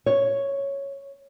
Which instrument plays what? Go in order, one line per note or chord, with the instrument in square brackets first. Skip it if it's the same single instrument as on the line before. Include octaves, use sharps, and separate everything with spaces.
[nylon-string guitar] C#5